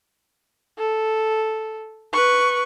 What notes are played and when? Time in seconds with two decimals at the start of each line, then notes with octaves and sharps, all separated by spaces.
0.78 A4
2.13 B4 C#6